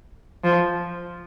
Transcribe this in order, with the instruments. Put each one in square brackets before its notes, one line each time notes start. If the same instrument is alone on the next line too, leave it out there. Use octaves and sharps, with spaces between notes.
[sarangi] F3